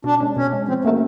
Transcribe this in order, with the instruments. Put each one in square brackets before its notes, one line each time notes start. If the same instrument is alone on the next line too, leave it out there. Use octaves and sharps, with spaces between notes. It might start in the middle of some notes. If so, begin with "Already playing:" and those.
[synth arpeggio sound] B2 [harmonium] D4
[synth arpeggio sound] G#3 C#4
[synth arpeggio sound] B2 [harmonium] C#4
[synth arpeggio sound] G#3 C#4
[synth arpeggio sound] F3 [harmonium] C4
[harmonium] A3 [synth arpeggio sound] A#3 C#4 F#4 A#4